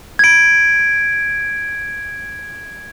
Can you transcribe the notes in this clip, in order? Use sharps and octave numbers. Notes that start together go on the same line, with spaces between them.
G#6 D7